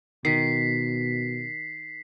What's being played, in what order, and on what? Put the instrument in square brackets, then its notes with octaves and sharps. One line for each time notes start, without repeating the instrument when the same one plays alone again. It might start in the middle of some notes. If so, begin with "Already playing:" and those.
[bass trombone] B2 [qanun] D#3 [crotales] B6 C7